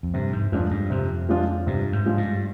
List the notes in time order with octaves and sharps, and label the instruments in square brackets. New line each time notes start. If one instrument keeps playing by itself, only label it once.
[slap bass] F2
[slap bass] G2 [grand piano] C3
[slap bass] G#2
[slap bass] F2 [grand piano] F3 G#3 D4 F4
[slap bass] G2
[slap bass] F2 [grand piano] C3
[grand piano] F3 G#3 D4 F4
[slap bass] G2 [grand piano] C3
[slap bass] G#2
[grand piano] F3 G#3 D4 F4
[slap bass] G2